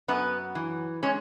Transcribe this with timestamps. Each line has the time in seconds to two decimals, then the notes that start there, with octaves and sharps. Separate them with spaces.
0.08 F#2 B3 B4
0.55 E3
1.03 G#3 C#4 C#5